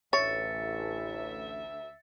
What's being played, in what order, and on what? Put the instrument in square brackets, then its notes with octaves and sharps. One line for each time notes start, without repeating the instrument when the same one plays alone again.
[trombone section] A1 [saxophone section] D2 E5 [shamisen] C#5 [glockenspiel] A6 C#7